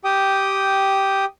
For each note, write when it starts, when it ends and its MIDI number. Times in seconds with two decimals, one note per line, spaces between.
0.05 1.25 67
0.05 1.25 79
0.05 1.25 87